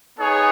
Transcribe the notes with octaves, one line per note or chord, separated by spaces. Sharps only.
B3 D#4 G#4 C#5